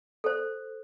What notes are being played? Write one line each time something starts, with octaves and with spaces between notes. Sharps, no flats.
A4 C5